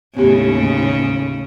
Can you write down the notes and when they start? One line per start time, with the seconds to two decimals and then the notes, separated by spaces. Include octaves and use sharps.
0.16 D#2 A2 C#3 B3 G4